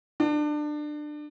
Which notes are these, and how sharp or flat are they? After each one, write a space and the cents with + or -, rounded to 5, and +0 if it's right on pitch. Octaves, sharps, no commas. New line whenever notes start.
D4 +25